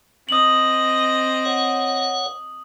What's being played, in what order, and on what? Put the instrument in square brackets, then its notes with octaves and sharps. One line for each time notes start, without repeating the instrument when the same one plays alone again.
[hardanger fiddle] C4 D#5 [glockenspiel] D#6 F#7
[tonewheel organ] C#5 F#5